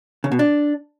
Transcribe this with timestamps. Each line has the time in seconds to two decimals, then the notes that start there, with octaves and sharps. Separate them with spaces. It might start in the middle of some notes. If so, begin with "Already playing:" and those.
0.24 C#3
0.32 B2
0.39 D4